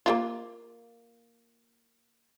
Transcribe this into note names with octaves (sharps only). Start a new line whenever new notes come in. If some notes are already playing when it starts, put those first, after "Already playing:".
A#3 E4 F4